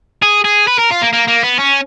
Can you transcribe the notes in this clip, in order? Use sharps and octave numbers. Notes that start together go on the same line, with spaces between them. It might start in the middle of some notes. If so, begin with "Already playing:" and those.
G#4
G#4
B4
A#4
F4
A#3
A#3
A#3
B3
C#4